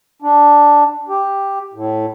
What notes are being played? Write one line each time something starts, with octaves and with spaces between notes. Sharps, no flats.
D4
G4
A2